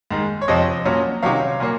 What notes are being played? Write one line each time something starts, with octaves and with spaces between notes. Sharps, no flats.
G#2 D#3 G#3
C#5
F2 C3 F3 D#5
A#2 F#3 C#4
C3 D#3 F#3 C#4 C#5 F5
A#2 F#3 A#3